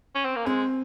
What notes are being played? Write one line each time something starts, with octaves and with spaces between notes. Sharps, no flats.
C#4
C4
A#3
G#3 C4